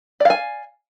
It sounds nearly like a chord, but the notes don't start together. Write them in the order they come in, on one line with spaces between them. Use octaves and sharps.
D5 F5 G#5